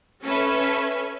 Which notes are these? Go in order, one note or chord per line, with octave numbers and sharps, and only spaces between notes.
C#4 A4 B4 E5